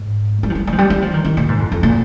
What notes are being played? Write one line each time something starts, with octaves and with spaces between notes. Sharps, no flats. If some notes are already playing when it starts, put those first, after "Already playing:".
Already playing: G#2
G3
F3
G3
G3
F3
G3
G3
F3
D#3
D#3
A#2
G#2
F2
F2
A#2